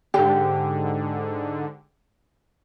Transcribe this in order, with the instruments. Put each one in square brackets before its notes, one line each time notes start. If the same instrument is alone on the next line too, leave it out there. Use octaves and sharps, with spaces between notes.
[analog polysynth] G#2 D3 [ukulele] G4